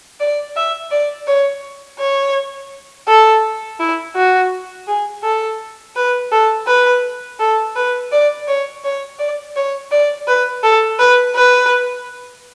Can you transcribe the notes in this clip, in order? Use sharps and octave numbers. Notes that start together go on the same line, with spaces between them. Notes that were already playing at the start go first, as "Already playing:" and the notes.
D5
E5
D5
C#5
C#5
A4
E4
F#4
G#4
A4
B4
A4
B4
A4
B4
D5
C#5
C#5
D5
C#5
D5
B4
A4
B4
B4